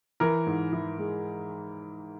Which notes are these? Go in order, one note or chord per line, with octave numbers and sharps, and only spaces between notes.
E3 A#4
G#2
E3
G#3